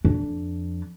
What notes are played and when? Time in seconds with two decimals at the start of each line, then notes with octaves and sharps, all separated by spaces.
0.05 F2 D4